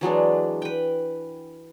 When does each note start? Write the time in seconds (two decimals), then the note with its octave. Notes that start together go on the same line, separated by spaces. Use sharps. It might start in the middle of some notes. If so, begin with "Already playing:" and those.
0.01 E3 F#3 G#3 D4
0.62 B4 G5